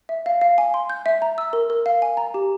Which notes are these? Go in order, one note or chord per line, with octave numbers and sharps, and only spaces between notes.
E5
F5
F5
G#5
C6
G6
E5
A#5
E6
A#4
A#4
F5
G#5
A#5
G4